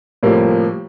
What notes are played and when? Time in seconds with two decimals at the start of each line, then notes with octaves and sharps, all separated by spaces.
0.23 A2 C3 F3 G3 A#3